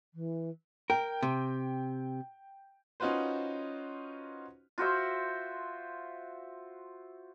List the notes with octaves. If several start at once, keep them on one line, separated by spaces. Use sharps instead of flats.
E3
A#4 G5
C3
C#4 D#4 F4 F#4 B4 C5
F4 F#4 C5 E5